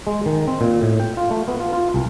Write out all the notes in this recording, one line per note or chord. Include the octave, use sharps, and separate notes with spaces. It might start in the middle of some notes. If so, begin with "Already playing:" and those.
G#3
D#3
C4
A#2
A2
G5
F4
A3
B3
F4
F4
C2